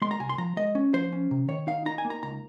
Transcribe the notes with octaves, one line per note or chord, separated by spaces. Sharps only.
G#3 C6
A#5
C2 G#5
C6
F3 A#5
G#3 D#5
C#4
F3 C5
C#4
C3
D#3 C#5
D#4 F5
D#4 A#5
G#5
A#3
A#5
C#2 A#5